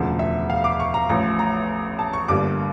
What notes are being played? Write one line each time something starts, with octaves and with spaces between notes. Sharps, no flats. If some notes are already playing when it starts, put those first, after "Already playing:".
Already playing: E1 D2 C#3 F3
E5
F5
D6
C#6
A#5
A1 A2 F3 A#5
A#5
A5
C#6
G1 G2 D3 G3 A#3 D6